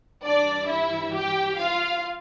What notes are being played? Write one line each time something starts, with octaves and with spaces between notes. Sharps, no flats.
G2 E3 G3 D4 D5
E4 E5
G4 G5
F4 F5